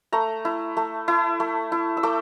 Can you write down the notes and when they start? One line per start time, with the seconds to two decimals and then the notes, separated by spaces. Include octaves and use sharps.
0.13 A3 A#5
0.45 E4
0.77 A3
1.08 E4
1.40 A3
1.72 E4
1.97 E6
2.03 A3 D6